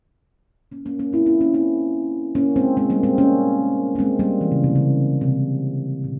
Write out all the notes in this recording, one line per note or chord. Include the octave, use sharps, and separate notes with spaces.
A#3 C#4
A#3 C#4
A#3 C#4
C4 E4
C4 E4
A#3 C#4
C4 E4
A#3 C#4
G#3 C4
G#3 C4
G3 A#3
G#3 C4
A#3 C#4
A#3
G#3 C4
G3 A#3
E3
C#3
C3
C#3
C3
A#2